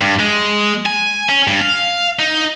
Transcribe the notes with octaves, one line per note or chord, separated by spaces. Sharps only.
G2
G#3
G#5
C#4
G2
F5
D#4